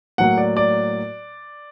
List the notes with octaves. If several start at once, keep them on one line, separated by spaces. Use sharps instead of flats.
A2 F#3 A#3 F#5
D5
D5